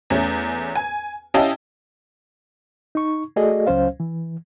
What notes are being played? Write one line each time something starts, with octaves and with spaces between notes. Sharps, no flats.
E2 A3 C#4
G#5
C#4 E4 G4 D#5 F5 A5
D#4 C#6
A3 F#4 G#4 A4 D5 D#5
C#2 F#3 C#4 C5 F5
E3